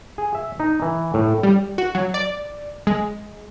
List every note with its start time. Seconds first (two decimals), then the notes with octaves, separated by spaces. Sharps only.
0.18 G#4
0.35 E5
0.60 D#4
0.82 E3
1.14 A2
1.43 G3
1.78 F#4
1.95 F#3
2.14 D5
2.87 G#3